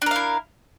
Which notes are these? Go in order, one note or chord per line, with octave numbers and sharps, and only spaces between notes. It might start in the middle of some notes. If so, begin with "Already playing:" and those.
D4 E4 A#4 F5